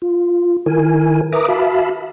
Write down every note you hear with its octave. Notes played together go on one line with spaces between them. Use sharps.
F4
D#3 E4 A#4 G#5
A#4 B4 E5 A#5 D6 D#6
F#4 E5 F5 A5 B5